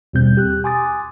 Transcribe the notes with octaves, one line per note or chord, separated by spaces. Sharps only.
D#2 B2 G3 C4 G6
G4 F#6
G#5 C6 D6 D#6 A6